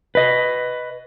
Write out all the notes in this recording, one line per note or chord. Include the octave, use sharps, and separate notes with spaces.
B4 D#5